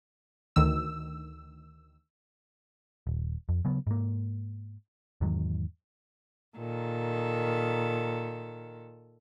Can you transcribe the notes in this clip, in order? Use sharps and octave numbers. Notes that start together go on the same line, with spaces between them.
D2 D#3 E6
D#1
F2
C#3 F#3 B3
G#2 A#3
E2 G#2 D#3 F#3
A#2 D#3 A4